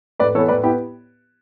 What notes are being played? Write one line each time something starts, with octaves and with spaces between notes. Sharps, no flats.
A2 B4 D5
E3 B3 A4 C#5
A2 B4 D5
B3 E4 G4